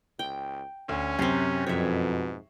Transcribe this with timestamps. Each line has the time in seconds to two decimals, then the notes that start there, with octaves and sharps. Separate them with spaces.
0.19 C#2 G5
0.89 D2 C#4
1.19 F#2 C3 C4 C7
1.67 F2 G#2 B2 C#5 E5